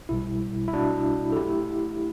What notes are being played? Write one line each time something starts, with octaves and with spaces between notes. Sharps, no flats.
B1 B2 G3 E4
E4
D4 F#4
A4
F#3 A3 E4 G4